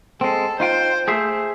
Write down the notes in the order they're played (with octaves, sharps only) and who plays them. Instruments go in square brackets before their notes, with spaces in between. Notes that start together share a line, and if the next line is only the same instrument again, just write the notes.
[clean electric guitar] G#3 C4 [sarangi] A4
[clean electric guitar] D#4 F4 G5 [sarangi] C5
[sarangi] A3 [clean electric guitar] G#4 C5 E5